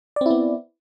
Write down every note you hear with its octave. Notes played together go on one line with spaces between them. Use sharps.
B3 C4 E4 D5